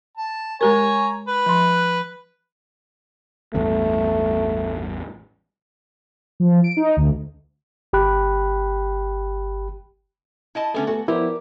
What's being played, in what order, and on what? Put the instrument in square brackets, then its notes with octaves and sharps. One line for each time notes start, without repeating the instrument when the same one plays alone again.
[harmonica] A5
[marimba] G#3 G4 A#4 [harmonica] C#5 G#5 A#5
[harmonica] B4
[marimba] F3 C6
[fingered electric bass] A1 E2 G2 [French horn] A3
[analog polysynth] F3
D7
D#4
D2
[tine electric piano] G1 G4 G5 B5 F#6
[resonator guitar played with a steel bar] E4 D#5 A5
[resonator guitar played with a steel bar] D3 C#4 G#4 [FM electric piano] A3 B3
[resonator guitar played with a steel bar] F#4 [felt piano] A4 G#5 A5
[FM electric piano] F3 B3 C5 [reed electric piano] E4 [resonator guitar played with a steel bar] G4 [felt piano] A#4 D5